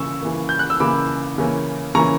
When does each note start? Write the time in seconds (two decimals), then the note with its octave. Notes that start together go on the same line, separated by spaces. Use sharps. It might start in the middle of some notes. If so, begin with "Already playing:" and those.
Already playing: C#3 E3 A#3 C#6 E6
0.23 C#3 E3 A#3
0.49 G6
0.59 F#6
0.70 E6
0.80 C#3 E3 A#3 B5 D6
1.38 C#3 E3 A#3 C#4
1.95 C#3 E3 A#3 C#4 A#5 C#6